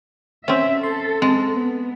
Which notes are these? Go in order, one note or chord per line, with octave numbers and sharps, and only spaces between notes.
C4 C#4 E5
A4 C6
G#3 C4
B3